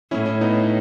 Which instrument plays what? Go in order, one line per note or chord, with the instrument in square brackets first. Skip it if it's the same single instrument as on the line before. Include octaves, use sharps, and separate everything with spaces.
[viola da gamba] A2 [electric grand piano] C#4 E4
[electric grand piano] C#4 E4
B3 D#4